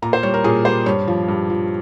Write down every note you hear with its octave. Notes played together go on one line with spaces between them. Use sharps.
A#2 A#5
C5
G3 C#5
A#4
A#2 G#4
G3 C5
G2 C#5
F3
G2
F3